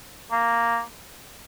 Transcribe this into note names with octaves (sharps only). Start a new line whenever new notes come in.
A#3